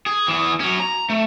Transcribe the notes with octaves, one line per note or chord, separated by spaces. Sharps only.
G#4
E3 G#4
F#3 C#4
A#5
A3